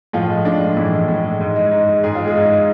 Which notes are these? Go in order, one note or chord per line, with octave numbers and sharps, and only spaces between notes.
A2 F3 F4
G#3
A2 D4
G#3
A2 E3 E4
G#3
A2
G#3
G#2
G#3
G#2
G#3
G#2 G#4
G#3 F4
G#3 G#4
G#2
G#3